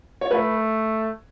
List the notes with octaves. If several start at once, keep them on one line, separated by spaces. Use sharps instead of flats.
C#5
A3 B4